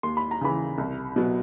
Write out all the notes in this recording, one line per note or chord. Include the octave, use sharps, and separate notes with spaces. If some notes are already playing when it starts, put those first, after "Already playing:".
D#2 C6
B5
A#5
C#3 E3 B5
C2
B2 F#3